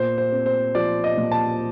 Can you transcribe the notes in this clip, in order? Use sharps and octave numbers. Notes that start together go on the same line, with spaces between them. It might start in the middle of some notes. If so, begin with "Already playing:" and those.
Already playing: A#2 C5
C5
C4
C5
F3 D5
D#5
A#2
A5